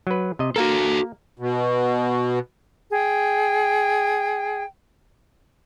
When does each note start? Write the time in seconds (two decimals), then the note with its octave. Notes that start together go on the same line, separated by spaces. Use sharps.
0.07 F#3 B4
0.39 C3 D#5
0.56 A#3 F#4 A4 A#4
1.39 B2
2.91 G#4 G5